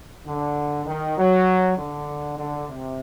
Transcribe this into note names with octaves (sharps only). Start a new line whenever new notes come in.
D3
D#3
F#3
D3
D3
C3